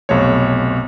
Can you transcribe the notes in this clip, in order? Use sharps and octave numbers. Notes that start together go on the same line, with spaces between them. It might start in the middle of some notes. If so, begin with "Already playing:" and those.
B1 F2 C3 A3 C#5